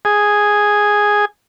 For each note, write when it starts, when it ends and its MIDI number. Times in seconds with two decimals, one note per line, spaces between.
0.05 1.25 68